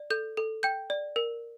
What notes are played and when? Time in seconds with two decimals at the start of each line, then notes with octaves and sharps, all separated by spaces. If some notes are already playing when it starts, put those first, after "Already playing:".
Already playing: D5
0.10 A4 G6
0.37 A4
0.63 G5 G6
0.90 D5
1.16 A#4